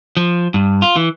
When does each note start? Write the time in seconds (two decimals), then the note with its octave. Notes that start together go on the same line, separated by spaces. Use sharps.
0.17 F3
0.54 G2
0.82 F4
0.96 E3